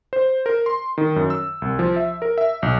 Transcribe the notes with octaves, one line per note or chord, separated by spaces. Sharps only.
C5
A#4
C6
D#3
F#2
E6
C2
F3
E5
A#4
E5
B1